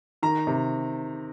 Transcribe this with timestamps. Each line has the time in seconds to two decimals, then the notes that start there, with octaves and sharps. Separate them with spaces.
0.23 D#3 A#5
0.47 C3